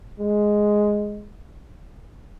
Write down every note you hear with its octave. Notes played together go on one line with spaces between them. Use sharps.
G#3